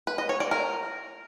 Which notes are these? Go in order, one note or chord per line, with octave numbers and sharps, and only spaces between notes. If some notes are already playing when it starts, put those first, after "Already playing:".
B4
D#5
C#5
D5
A#4